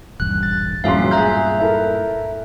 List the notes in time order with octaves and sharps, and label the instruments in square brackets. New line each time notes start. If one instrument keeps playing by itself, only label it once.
[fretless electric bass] D#1 A1 G2 [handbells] F#6
[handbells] A6
[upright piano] E1 F#3 C6 [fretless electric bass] G2 A#2 [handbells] C#4 E5 F5
[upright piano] G#4 F#6 [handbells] E5 A#5 G6
[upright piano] E4 A4 A#4